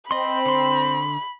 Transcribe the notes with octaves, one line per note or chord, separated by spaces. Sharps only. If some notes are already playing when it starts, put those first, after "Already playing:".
C4 D#5 B5 C6
D3 C6